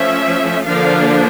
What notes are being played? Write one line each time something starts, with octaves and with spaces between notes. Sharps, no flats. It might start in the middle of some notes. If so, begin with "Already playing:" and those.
Already playing: F3 A3 C#4 E5
D3 F3 A#3 D4 F5